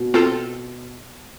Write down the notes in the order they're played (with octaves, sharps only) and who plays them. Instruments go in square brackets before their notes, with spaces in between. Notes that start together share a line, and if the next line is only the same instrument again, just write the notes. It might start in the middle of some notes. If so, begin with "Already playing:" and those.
Already playing: [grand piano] B2
[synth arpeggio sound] C4 F4 A4